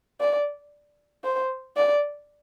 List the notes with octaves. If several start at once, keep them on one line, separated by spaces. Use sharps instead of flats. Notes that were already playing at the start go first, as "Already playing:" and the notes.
D5
C5
D5